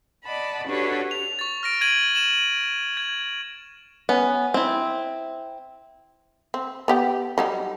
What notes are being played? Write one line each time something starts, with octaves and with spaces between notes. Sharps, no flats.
D5 D#5 F#5 A5 B5
D4 F#4 G4 A4 B4 C#5
F7
C#6 A6
F6 A#6 D7
G#6 D7 D#7 F#7
D#7 E7 F#7
G#6
B3 C#4
C4 E4
C4
B3 G4 G5
F#3 G3 D#4